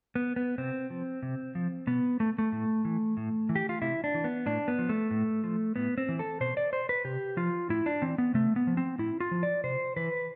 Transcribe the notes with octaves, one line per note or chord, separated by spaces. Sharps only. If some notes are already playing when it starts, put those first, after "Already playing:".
B3
B3
C3 C4
F3
C3
F3
B2 B3
A3
A3
A2
E3
A2
E3
G4
F4
C3 E4
D4
E3
B3
A2 D4
B3
F3
A3
A2
F3
A2 B3
C4
E3
A4
B2 C5
D5
C5
B4
C3 G4
F3 F4
A2 E4
D4
E3 C4
B3
C3 A3
B3
F3
C4
A2 E4
F4
F3
D5
C3 C5
E3 B4